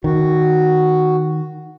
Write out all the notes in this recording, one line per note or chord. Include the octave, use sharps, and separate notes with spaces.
D#3 F#4